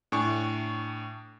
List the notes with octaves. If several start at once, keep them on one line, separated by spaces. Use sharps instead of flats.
A2 D4 G#5 C#6